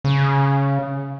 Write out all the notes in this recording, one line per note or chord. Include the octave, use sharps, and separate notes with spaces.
C#3